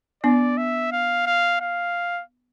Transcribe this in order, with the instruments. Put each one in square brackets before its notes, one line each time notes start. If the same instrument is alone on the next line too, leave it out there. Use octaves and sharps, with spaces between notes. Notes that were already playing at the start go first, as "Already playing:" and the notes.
[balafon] B3 D4 [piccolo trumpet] D5
[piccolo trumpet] E5
F5
F5
F5